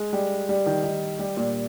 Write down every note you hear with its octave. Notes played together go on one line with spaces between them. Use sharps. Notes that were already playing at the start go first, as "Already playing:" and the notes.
Already playing: G#3
G3
G3
D#3
D#3
G3
A#2